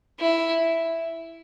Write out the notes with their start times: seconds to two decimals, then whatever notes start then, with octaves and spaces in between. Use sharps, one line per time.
0.20 E4